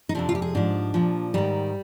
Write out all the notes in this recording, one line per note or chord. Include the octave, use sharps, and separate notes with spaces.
D#4
F2 C3 F3 D4
F4
G4
G#4
G#2 F3 D4
A#2 F3
G#2 D#3 G3